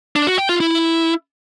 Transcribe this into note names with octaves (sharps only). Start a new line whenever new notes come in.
D4
F#4
G5
F4
E4